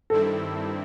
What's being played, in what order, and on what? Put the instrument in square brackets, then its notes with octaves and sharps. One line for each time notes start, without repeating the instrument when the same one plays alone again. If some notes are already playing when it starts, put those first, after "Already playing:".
[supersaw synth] G2 D#3 G3 C4 E4 [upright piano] A4